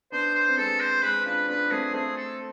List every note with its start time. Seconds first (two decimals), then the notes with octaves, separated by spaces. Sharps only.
0.12 B3 D4 C5
0.35 C5
0.48 C4
0.57 G#3 B3 A4
0.80 C5
1.03 G#3 B4
1.25 D4 F4 B4
1.49 B3 D4 B4
1.71 A3 C4 G#4
1.93 A3 C4 G#4
2.16 A4